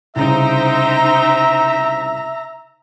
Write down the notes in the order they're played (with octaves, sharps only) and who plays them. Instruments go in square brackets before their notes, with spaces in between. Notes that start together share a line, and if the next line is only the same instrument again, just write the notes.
[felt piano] C2 C#3 [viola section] D#4 C5 G5 [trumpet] E5 [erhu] A#5